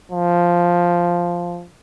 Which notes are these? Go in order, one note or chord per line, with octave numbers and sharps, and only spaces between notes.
F3